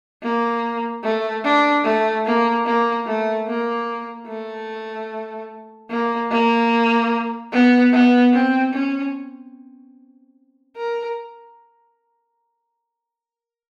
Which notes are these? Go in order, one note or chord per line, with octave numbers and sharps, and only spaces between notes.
A#3
A3
D4
A3
A#3
A#3
A3
A#3
A3
A#3
A#3
B3
B3
C4
C#4
A#4